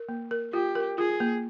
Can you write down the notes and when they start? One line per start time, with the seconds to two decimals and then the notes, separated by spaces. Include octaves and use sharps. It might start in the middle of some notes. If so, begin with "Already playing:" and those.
Already playing: A#4
0.09 A#3
0.31 A#4
0.53 F4 G4
0.75 A#4
0.98 F4 G#4
1.20 A#3